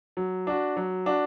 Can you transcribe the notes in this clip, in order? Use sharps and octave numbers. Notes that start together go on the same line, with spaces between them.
F#3
D4 F#4
F#3
D4 F#4